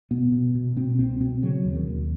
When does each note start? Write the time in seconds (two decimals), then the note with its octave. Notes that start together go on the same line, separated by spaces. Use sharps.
0.11 B2 B3
0.32 B2
0.55 B2
0.76 B2 C4
0.99 C2 C4
1.20 B2 C4
1.42 C#3 F#3
1.64 D#2
1.75 D#3
1.87 D#2